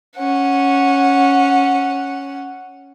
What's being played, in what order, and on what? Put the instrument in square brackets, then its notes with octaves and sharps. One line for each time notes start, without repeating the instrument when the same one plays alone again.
[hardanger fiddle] C#4 F#5